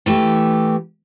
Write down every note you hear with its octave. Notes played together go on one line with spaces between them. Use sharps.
E3 A3 G4